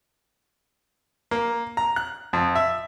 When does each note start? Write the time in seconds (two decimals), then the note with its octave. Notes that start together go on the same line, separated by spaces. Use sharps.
1.31 A#3
1.77 A#5
1.96 F#6
2.33 F2
2.55 E5